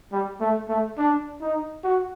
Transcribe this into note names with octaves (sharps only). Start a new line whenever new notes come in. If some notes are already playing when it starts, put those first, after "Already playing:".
G3
A3
A3
D4
D#4
F#4